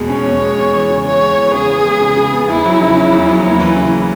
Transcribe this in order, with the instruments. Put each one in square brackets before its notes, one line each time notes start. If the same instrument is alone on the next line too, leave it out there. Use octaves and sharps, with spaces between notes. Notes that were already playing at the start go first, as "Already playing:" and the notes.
Already playing: [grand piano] E2 B2 G#3
[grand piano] C#4 [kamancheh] C#5
[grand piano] E2
G#3
E2
E3
C#3
[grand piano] G#3 [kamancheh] C#5
[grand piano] E2
E3
[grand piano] C#3 [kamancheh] G#4
[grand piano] B3
G#3
C#3
C#3
B3
[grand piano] E2 [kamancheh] E4
[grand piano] F#3
C#3
C#4
E2
F#3
[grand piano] D#2 [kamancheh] E4
[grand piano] E3
C#3